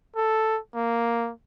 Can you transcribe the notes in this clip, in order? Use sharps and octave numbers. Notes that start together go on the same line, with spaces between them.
A4
A#3